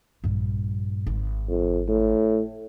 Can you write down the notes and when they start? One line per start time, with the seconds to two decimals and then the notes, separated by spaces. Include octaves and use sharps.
0.24 A#1 G2
1.07 G#1
1.48 F2
1.88 A2